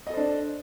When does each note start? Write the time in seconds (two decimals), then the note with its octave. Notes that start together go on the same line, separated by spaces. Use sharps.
0.07 D#5
0.10 A4
0.14 C5
0.17 D4